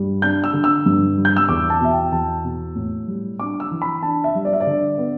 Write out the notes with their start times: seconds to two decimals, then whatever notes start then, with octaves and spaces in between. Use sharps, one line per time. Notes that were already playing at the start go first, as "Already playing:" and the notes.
Already playing: G2 G3
0.22 D4 G6
0.44 E6
0.53 D3
0.64 E6
0.86 G2
1.17 G3
1.25 G6
1.37 E6
1.49 E2 D6
1.70 A5
1.80 B2 E5
1.91 G5
2.12 E2 A5
2.44 B2
2.75 A2
3.07 G3
3.39 D4 D6
3.60 E6
3.71 E3
3.82 B5
4.02 D4 A5
4.24 E5
4.35 G3
4.45 D5
4.53 E5
4.60 D5
4.67 D3
4.98 B3